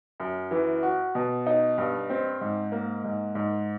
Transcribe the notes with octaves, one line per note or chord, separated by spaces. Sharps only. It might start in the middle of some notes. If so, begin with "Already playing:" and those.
F#2
E3
F#4
B2
D#4
G2
C4
G#2
A#3
G#2
G#2